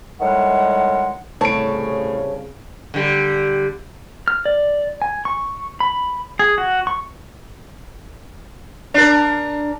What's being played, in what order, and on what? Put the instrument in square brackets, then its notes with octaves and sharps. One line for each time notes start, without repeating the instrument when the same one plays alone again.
[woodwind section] A2 D#3 G3 G#3 F#5
[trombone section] C2 C#3 [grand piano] A2 D7 [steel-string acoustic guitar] C#5 A5
[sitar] D3 G3
[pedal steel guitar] F6
D5
G#5
C#6
B5
G#4
F#4
C#6
[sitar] D4 A#4